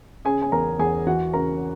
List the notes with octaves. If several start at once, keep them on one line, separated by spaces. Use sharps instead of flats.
C#3 G#4 G#5
G#5
E2 A#4 A#5
E2 G#4 G#5
E3 F#4 F#5
C#3 A#4 A#5